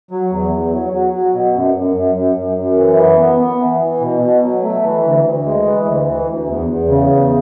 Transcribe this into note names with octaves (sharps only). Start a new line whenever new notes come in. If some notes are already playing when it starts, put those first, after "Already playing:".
F#3
E2
E2
F#3
F#3
F#3
B2
F#2
F#2
F#2
F#2
F#2
F#2
E3
B3
B3
B3
E3
E3
B2
B2
F#3
A3
E3
D2
D2
G#3
E3
D2
E3
D2
E2
E2
C#3
E2